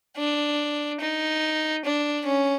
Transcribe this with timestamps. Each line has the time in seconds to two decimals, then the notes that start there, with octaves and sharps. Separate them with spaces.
0.17 D4
1.01 D#4
1.84 D4
2.25 C#4